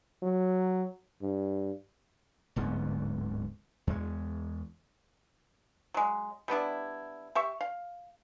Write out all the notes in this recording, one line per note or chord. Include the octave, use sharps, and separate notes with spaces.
F#3
G2
D1 G#2 D3 B3
E2 G#3
F#3 G#3
G3 B3 D4 E4
G4 E5 C#6
F5